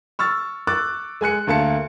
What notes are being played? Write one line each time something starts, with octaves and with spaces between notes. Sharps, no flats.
C#6 E6 F6 A6
C#6 D6 E6 F#6 A6
G#3 G#5 F#6 C#7
D2 A#3 A5 C#7